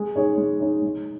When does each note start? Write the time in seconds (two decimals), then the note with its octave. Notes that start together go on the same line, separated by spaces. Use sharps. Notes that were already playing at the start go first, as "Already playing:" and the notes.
Already playing: G#3
0.16 D#4 G#4 C#5
0.38 G#3
0.60 D#4 G#4 C#5
0.82 G#3